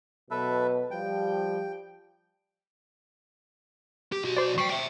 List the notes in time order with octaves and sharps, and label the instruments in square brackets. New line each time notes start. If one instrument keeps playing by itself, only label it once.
[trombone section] B2 F#3 [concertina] A4 B4 E5
[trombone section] F3 G3 [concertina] G5
[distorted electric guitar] G4
B1 F#4
[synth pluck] C5 D5
[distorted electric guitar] G3 G5 [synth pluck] C#6 C7
[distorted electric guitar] E5 G5